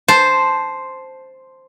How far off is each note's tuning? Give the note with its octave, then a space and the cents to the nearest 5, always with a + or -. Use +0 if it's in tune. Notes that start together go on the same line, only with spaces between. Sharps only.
C5 +0 A5 -5